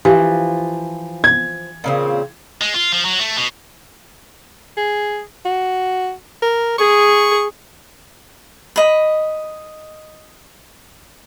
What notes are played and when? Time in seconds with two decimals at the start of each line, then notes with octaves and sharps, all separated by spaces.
0.05 E3 F3 G4
1.24 G#6
1.84 A#2 C#3 C4
2.62 G#3
2.75 F4
2.92 F3
3.05 F#3
3.19 A3
3.37 B2
4.77 G#4
5.45 F#4
6.42 A#4
6.78 G#4 C#6
8.76 D#5 B5